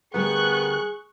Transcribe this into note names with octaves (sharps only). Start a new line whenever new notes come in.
D2 G3 B3 G#4 A#4 C#6 F#6